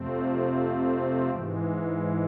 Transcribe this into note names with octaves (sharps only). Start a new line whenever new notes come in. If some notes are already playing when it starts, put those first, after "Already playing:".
Already playing: F2 C3 F3 A3 C4
G#2 E3 G#3